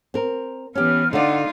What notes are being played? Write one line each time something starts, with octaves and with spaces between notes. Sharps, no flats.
C4 A#4
E3 B3 C#4 G4 F6
D3 D#4 F4 D5 F#5